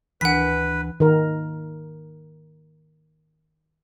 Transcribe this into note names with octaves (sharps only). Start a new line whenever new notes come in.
D2 E3 D4 B4 F#5 B6
D#3 A#4